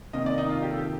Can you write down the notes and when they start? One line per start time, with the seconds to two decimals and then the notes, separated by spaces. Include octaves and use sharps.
0.13 C3 D#3 A#3 D#5
0.26 D5
0.38 D#4
0.49 F4
0.62 G4
0.70 A4
0.78 G4